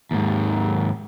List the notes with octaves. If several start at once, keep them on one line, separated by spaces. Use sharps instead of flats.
D#2 G#2